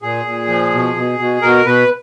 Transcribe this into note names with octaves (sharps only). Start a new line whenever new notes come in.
A#2 G#4
A#2
F3
B2
B2
B2
B2 A#4
B2 B4